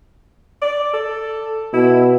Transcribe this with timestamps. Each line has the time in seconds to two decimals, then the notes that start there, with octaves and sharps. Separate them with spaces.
0.62 D5
0.93 A4
1.73 B2 E4